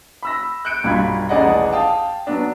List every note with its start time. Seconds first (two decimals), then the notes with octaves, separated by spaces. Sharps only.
0.23 B5 E6 A#6
0.65 F#6 G6 C#7 D7
0.83 B1 G2 F4 B5 G#6
1.29 D#1 A1 G#4 D5 D#5 F#5
1.72 F5 G5 A5 D#6
2.27 F#3 B3 D4